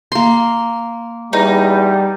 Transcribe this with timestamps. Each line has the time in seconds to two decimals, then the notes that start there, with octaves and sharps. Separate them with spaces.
0.12 A#3 C6
1.33 E2 G3 D#4